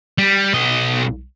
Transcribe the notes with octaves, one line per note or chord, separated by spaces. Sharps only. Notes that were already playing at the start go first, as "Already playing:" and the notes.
G3
B1 D#5